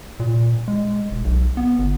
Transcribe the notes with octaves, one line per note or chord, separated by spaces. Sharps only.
A#2
G#3
E1
B1
B3
G1